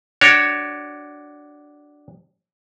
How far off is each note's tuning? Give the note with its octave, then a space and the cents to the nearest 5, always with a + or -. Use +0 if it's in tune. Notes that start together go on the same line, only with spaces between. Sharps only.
D4 +0 F#4 +20 C#5 +0